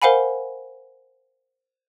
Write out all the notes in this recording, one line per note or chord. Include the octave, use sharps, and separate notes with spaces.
A#4 C5 F5 F#5 G#5 B5